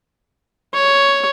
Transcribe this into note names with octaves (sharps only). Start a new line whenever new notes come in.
C#5